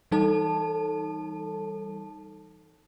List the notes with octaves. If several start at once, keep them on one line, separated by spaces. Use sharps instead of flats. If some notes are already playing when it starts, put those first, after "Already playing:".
E3 G3 D#4 A4 A5